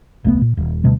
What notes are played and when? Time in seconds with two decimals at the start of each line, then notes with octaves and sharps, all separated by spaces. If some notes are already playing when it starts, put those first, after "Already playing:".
0.24 D#1 C2 A3 B3
0.41 A#2
0.57 D#1
0.84 D2 B2 G3 A3